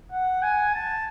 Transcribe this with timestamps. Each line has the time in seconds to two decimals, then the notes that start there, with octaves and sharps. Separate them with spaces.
0.12 F#5
0.42 G#5
0.74 A5